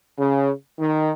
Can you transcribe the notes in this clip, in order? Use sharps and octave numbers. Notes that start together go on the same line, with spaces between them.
C#3
D#3